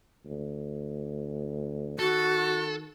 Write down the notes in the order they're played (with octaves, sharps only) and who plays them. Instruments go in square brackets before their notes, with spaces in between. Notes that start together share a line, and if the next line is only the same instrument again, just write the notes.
[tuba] D2
[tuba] D#3 [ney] F#4 [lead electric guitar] A4